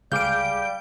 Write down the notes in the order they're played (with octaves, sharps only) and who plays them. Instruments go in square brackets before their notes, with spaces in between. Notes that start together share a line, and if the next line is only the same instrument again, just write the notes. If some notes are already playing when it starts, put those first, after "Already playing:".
[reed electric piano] C#2 G#4 D6 [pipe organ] G3 [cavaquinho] F5 [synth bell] G6 D7